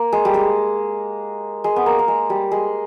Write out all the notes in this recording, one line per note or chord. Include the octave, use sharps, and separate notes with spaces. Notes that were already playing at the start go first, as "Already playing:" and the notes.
Already playing: A#3
G#3
G3
G#3
G#3
B3
A#3
A#3
G#3
G3
G#3